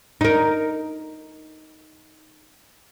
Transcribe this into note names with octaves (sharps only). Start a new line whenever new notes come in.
D#4 A#4